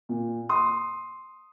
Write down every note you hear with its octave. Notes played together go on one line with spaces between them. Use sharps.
A#2
C6 D#6